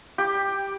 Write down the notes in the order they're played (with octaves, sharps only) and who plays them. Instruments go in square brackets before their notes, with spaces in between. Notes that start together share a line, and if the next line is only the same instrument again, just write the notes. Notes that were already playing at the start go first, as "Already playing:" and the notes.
[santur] G4